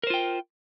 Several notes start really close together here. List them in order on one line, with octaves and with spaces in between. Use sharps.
A#4 C5 F4 G5